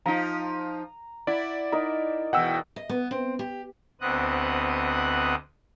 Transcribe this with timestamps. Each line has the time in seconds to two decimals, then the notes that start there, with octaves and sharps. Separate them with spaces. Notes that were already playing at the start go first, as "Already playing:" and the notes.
0.06 F3 D#4 A#5
1.27 E4 D5 F#5
1.72 D#4 A#4
2.33 E2 B2 F#5 G5 E6
2.76 D#5
2.89 B3
3.11 C4
3.39 G4
4.01 D2 B3 C4 D#5 D#6 F#6